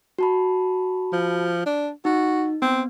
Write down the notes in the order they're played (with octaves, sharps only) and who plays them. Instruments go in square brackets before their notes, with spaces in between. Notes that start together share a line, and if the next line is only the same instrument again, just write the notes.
[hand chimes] F#4 A5 B5
[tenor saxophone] F3
D4
[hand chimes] D#4 [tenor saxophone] F#4
[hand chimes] B3 [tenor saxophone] C4